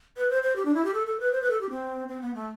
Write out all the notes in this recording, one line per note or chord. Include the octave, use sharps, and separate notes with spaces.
B4
C5
C5
G4
D4
E4
G4
A4
A4
B4
C5
B4
A4
G4
C4
C4
B3
A3